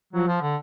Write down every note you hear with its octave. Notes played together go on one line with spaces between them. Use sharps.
F3 F#3
F3
D3